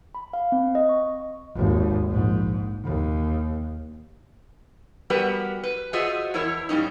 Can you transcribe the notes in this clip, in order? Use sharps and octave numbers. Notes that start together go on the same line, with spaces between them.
B5
F5
C4
D#5
C#6
G#1 D#2
A#1 G#2
D#2
G3 B3 F#4 G4 A#4 B4
B4
F4 F#4 G#4 C5 D#5 E5
E2 E4 A#4 C#5 E5
A#2 G3 C#4 D#4